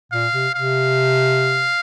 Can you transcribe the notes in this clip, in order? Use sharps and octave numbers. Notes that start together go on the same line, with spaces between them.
A#2 F5
C3
C3 F5